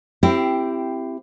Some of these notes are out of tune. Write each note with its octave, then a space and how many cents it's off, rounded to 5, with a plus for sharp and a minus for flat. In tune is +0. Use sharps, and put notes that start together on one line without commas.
C4 +0 E4 +20 G4 +0